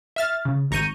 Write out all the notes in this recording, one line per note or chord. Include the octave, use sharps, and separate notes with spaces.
E5 F6 A6
C#3
G#1 A#5 C#6 G6 D#7